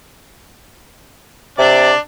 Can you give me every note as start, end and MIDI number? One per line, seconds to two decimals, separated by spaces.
1.58 1.91 48
1.58 1.98 62
1.58 1.98 74